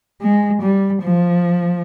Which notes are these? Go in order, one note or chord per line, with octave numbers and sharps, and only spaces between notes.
G#3
G3
F3